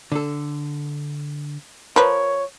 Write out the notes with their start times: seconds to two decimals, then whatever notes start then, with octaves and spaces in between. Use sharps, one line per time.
0.12 D3 A4
1.96 F3 A#4 B4 C#5